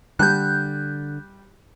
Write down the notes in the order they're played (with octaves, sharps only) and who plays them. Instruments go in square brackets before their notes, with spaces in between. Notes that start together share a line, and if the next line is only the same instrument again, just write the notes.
[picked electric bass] D3 [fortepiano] G3 [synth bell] F#6 G6